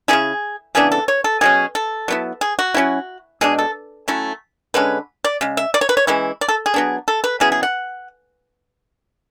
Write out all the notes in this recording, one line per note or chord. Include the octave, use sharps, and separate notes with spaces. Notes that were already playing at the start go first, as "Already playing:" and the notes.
C#3 F#3 C#4 E4 G#4
C#3 E3 B3 D4 G#4
A4
C#5
A4
B2 F#3 C#4 G#4
A4
F#3 B3 E4
G#4
F#4
F#3 C#4 E4
B2 G#3 D4 G#4
A4
F#3 A3 C#4 E4
D3 G#3 C#4 B4
D5
C#3 G#3
E5
D5
C#5
B4
C#5
E3 G#3 C#4 E4
D5
A4
G#4
F#3 B3 D4
A4
B4
C#3 F#3 B3 E4 G#4
G#4
F#5